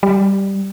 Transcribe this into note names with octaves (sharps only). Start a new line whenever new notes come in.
G3